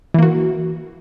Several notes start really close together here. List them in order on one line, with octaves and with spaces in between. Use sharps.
E3 A#3 F#4